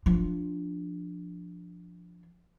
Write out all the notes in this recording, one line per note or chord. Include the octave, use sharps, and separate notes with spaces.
F3 D4